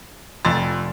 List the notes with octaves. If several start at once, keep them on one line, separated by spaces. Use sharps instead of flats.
F1 F2 A6